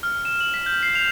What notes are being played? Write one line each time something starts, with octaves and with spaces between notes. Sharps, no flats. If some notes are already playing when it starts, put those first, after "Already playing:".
F6
E7
F#7
B6
G6
C7
F7